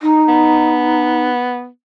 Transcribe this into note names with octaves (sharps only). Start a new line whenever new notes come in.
D#4
B3